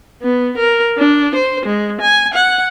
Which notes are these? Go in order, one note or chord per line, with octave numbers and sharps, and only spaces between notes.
B3
A#4
D4
C5
G#3
G#5
F#5